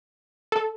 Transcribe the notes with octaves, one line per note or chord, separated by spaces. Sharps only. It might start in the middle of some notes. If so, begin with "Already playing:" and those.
A4